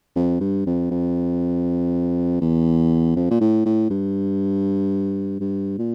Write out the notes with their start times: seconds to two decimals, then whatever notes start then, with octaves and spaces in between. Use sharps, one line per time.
0.16 F2
0.40 G2
0.66 F2
0.91 F2
2.41 E2
3.16 F2
3.30 A#2
3.40 A2
3.65 A2
3.90 G2
5.40 G2
5.78 A#2